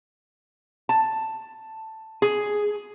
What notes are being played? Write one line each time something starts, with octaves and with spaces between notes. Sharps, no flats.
A5
G#4